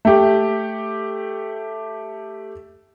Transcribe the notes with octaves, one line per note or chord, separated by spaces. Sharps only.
A3 G4